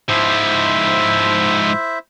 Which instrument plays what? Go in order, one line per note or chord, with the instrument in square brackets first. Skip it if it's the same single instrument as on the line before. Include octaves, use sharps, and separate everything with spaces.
[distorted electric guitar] G#2 F3 [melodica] E4 C5 E5